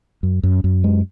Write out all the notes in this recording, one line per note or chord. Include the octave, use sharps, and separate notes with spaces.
F#2
F#2
F#2
G#3